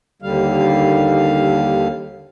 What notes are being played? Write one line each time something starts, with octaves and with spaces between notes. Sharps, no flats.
D#2 D3 G3 F5